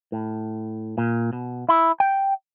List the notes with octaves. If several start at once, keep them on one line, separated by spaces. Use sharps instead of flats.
A2
A#2
B2
E4
G5